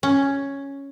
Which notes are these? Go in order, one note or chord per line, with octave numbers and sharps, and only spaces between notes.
C#4